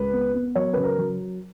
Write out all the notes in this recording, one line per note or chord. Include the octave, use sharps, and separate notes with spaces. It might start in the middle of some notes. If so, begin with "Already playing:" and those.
Already playing: C#2 B4
B3
B3
F#3 C#5
C#3 B4
A#4
F#3